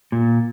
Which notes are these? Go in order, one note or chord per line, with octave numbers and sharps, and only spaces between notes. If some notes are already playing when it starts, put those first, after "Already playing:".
A#2